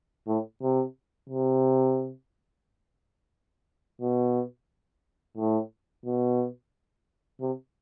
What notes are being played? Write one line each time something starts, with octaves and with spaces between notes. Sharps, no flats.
A2
C3
C3
B2
A2
B2
C3